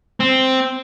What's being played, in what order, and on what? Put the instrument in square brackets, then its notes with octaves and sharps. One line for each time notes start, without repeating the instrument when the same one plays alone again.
[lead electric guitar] C4